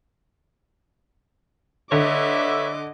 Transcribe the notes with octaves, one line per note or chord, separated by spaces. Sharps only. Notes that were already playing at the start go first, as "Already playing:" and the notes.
D3 B4 C#5 D#5 E5 D6